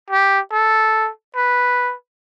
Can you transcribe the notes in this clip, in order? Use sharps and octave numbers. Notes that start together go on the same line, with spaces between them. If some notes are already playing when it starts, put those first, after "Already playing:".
G4
A4
B4